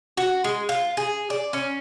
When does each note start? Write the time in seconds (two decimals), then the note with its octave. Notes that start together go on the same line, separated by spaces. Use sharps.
0.17 F#4
0.44 G#3
0.69 F4
0.97 G#4
1.30 D5
1.53 C#4